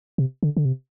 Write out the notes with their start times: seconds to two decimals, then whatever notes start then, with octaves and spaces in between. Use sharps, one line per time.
0.18 C3
0.43 D3
0.57 D3
0.65 C3